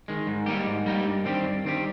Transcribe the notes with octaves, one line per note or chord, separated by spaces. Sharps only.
D#3 G#3
G#2
G3 A#3 D#4 G4
G#2
G3 A#3 D#4 G4
G2
D#3 G3 C4 G4
G2
D#3 G3 C4 G4